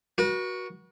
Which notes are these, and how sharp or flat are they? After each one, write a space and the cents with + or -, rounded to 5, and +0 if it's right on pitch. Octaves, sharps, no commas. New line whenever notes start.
F#4 +0 B4 -45